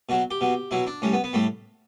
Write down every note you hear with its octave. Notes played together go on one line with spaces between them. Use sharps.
B2 F#3 F#4
G4
B2 F#3
B2 F#3 E4
D4
A2 G3 C#4
B3
B3
A2 G3 A3